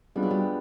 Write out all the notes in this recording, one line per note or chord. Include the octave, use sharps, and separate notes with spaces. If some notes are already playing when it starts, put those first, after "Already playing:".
G3 G#3 B3 D4 F4
F#3
G3